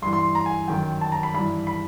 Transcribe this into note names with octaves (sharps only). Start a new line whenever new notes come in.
G2 E3 C6
C6
A#5
G#5
F#2 D#3 G5
A5
A#5
B5
G2 E3 B5
B5